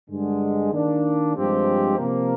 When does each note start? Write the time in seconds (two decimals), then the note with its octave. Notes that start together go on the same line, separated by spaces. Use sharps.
0.09 G2 D3 G#3
0.72 D#3 A#3 D4
1.35 G2 F3 G#3 C4 G4
1.99 C3 F3 A#3